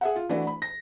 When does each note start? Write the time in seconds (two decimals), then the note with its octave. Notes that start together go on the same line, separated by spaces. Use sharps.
0.01 G#4 E5 F#5
0.16 F4
0.29 E3 A3 D4 E4 F#4
0.47 B5
0.62 A#6